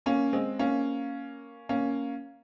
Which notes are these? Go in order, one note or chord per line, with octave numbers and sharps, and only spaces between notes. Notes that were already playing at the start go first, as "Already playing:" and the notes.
A#3 C#4
G#3 C4
A#3 C#4
A#3 C#4